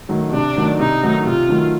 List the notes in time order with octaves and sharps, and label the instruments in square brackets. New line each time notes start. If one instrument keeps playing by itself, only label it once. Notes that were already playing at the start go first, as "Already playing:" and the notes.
[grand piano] D#3 F#3 A3
[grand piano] C3 [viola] D4
[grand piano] D#3 F#3 A3
[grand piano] C3 [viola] D#4
[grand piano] D#3 F#3 A3
[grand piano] C3 [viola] F4
[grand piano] D#3 F#3 A3